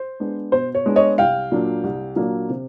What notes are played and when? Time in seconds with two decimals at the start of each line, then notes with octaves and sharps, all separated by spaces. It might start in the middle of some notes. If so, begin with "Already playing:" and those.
Already playing: C5
0.20 G#3 B3 D4
0.52 B2 C5
0.75 C#5
0.86 G#3 B3 D4
0.96 C#5 D#5
1.18 C2 F5 G5
1.51 A#2 F#3 A#3 D4
1.84 C2
2.16 A#2 F#3 A#3 D4
2.49 C3